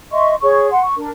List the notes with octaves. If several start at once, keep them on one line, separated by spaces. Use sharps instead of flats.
D#5 E5 C6 C#6
G#4 C#5 C#6
F#5 C6
C#6
D4 A#4